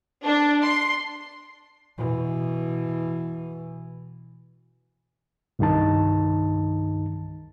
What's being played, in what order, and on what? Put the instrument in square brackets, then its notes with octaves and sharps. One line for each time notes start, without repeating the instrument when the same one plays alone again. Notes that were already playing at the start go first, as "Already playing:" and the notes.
[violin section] D4
C6
[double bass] B2 E3
[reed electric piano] C2 G2 D#3 D#4 A5